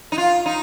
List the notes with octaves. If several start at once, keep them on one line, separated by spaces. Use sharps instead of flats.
D#4
F4
D#4